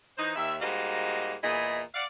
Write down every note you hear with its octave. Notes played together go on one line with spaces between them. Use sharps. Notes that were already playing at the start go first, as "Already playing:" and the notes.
E3 D#4 C5
D#2 E5
G#2 G3 A#3 F#4 D#5 F5
E2 A#2 E4 G#4 D#5
D5 F5 F#5